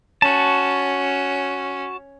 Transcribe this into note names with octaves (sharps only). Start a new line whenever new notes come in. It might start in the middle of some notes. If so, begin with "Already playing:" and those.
C#4 F#4 A5